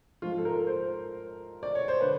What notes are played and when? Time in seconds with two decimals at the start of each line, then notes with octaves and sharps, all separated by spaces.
0.22 G#2 F3 F4
0.38 A4
0.45 A#4
0.67 C5
1.63 D5
1.75 C#5
1.88 C5
2.01 D3 B4